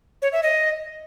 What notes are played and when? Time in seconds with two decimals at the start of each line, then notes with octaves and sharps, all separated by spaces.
0.22 C#5
0.32 E5
0.43 D#5